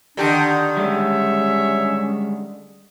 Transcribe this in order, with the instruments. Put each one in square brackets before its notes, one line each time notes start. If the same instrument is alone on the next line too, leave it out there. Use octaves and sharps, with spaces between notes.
[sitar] D3 D#3 G4 [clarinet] D4
[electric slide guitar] G3 G#3 [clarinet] C#4 [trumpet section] C#5 E5